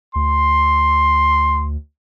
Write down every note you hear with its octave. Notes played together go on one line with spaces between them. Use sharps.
D2 C6